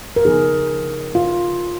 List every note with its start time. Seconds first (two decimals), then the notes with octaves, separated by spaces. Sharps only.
0.16 A#4
0.25 C#3 F3 B3 D#4 G#4
1.15 F4